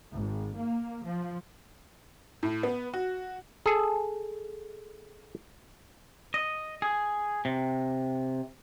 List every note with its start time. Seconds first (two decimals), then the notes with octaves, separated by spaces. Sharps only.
0.13 G#1
0.55 A#3
1.05 F3
2.43 A2
2.63 B3
2.94 F#4
3.66 G#4 A4
6.34 D#5
6.82 G#4
7.45 C3